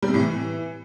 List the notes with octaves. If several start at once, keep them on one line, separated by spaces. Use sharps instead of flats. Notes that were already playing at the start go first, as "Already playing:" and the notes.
G3
C3
A2
E3